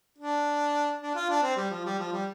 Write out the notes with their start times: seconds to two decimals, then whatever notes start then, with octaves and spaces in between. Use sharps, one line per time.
0.19 D4
1.02 D4
1.15 F4
1.29 D4
1.43 C4
1.57 G3
1.71 F3
1.85 G3
1.99 F3
2.12 G3